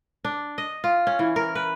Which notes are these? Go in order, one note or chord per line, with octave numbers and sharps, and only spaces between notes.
D4
D#5
F4
C#4
E3
A#4
B4